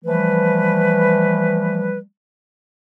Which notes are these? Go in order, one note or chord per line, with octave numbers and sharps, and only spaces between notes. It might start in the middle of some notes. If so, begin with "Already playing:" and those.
E3 F3 G3 A3 B4